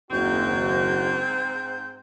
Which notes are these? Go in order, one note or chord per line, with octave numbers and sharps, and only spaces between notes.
F#1 D#2 G#2 C4 F#4 G6